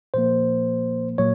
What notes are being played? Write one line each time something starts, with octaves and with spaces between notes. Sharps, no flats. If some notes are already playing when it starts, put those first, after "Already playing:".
A#2 F3 A#3 C5
A#2 F#3 A#3 C#5